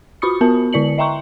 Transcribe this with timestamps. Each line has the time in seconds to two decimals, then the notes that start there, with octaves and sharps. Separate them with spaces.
0.22 F4 F#4 B5 C#6 D#6 C#7
0.41 B3 F#4 A#4 A5
0.73 D3 E4 D5 C#7 F#7
0.98 D#5 E5 G5 A#5 C6 C#6